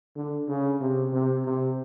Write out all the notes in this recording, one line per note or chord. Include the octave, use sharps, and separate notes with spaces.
D3
C#3
C3
C3
C3